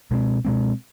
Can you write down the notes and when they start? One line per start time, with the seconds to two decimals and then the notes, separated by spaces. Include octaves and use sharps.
0.11 B2 G#3 C4
0.45 B2 G#3 C4